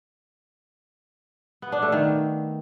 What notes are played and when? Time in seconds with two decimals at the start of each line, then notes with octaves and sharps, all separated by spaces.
1.62 B3
1.72 D4
1.82 A3
1.92 D#3